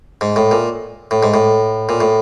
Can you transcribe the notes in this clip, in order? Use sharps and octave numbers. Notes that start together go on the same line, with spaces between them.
G#2
A2
A#2
A2
G#2
A2
A#2
A2